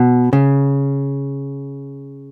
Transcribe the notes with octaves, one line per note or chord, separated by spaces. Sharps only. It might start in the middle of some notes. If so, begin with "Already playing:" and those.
Already playing: B2
C#3